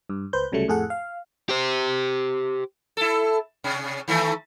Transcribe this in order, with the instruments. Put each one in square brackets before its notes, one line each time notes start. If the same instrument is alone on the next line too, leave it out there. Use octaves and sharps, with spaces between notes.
[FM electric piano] G2
C#2 B4 C5 G6
C2 C#3 F#3 G3 A3 C#7
F2 A2 G#4 A4 F#5
F5
[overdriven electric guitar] G4 C5
[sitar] E4 A4
C3 C#4
D#3 E3 A3